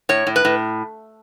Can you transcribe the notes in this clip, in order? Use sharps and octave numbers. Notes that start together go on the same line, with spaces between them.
A2 C#5
A2
B4
A2